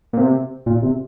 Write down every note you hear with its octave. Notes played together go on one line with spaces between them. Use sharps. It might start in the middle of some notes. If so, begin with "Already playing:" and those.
A#2
C3
A#2
C3